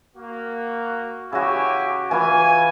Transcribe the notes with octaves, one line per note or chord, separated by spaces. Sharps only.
A#3 F#4
C#3 E4 F#4 G4 G#5
E3 F4 B4 G#5